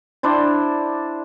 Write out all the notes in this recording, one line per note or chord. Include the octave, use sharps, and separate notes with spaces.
D4 E4 C5 D5